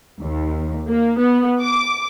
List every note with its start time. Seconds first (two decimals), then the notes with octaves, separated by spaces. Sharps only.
0.23 D#2
0.86 A#3
1.17 B3
1.61 D6